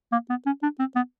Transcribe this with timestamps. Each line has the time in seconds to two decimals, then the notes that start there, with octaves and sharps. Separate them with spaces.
0.12 A#3
0.30 B3
0.46 C#4
0.63 D4
0.79 C4
0.96 B3